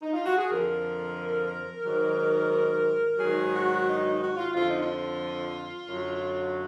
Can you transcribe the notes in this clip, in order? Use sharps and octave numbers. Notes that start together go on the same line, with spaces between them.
D#4
F4
F#4
G#4
F2 D3 F3 A#4
G#2 D#3 F#3
G#2 D#3 F#3 G#4
F#4
D#4
D#4
F#4
F4
F2 D3 F3 F4
D#4
F4
F#2 D3 F#3